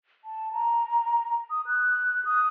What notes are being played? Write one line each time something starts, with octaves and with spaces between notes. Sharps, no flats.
A5
A#5
D#6
F#6
D#6